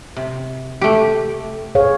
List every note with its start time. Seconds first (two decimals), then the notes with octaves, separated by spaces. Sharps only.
0.17 C3
0.81 A3 G4
1.75 G#4 C#5 F5